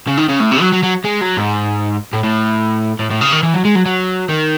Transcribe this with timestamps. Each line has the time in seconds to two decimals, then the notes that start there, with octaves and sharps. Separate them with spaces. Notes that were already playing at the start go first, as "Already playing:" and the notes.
0.07 C#3
0.17 D#3
0.28 C#3
0.40 A2
0.51 C3
0.61 F#3
0.72 F#3
0.83 F#3
1.04 G#3
1.21 F#3
1.37 G#2
2.13 A2
2.24 A2
2.99 A2
3.11 A2
3.21 C#3
3.32 D#3
3.43 E3
3.54 F#3
3.65 G#3
3.75 F#3
3.85 F#3
4.29 D#3